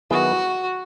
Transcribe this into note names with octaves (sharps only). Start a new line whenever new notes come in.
D#3 F#3 B3 E4 F#4 G#4